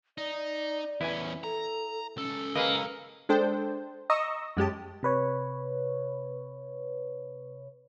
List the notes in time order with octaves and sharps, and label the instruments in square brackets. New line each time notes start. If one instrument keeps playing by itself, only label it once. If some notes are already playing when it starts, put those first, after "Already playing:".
[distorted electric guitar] D#4 [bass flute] D5
[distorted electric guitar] E2 C#4 [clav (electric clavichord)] E4 B4 G#5
[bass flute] A4 [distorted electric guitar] A#5
[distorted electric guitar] C#2 A4 [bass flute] C#4
[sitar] A#3 [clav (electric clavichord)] G#4 B4 D#5
[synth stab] G#3 D4 A4 C5 G5
D#5 A#5 C#6 D#6 E6 A#6
F#2 G#3 G4 A5
[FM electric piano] C3 B4 C#5